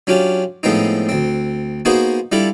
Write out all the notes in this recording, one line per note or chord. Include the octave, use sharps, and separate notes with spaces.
F#3 C#4 D4 F4 G4
A2 F3 G#3 B3 C4 D#4
D2 C4
A#3 B3 D#4 F#4 G#4 C5
G3 D4 E4 F4 A4